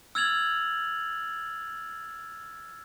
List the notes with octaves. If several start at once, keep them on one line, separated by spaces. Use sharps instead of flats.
E6 F6 G#6 A6 F7 F#7